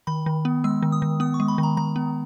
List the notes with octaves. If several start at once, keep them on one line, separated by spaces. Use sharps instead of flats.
D#3 B5
D#3
B3
G#3 E6
D#3
D#6
D#3
B3 D#6
C#6
G#3
B5
D#3
A#5
D#3 A#5
B3